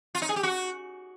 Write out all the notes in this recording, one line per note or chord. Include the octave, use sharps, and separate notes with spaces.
F4
D#4
G#4
G4
F#4